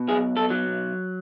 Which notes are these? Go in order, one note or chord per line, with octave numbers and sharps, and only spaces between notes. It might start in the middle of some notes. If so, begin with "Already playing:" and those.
Already playing: B2
B1 G#4
A4
F#3